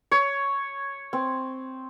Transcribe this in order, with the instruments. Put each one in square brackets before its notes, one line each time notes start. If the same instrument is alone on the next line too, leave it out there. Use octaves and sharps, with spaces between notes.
[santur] C#5
C4